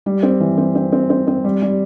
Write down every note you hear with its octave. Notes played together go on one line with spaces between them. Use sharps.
G3
C4
E3
C4
C4
C4
C4
C4
G3
G3